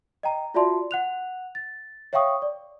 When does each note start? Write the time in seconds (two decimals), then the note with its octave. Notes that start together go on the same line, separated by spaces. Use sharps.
0.23 D#5 G5 A#5
0.54 F4 F#4 D5 E5 A5 C6
0.91 F#5 F#6 F7
1.55 A6
2.13 C#5 E5 F5 G5 C#6 D#6
2.42 D5